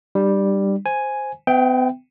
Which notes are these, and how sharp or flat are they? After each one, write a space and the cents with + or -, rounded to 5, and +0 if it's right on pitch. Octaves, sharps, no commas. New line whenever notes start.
G3 +0 D4 +40
C5 +0 G#5 +0
B3 +45 E5 +5 G5 +0